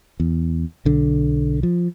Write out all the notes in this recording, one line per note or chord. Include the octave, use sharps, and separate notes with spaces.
E2
B1 D3
F3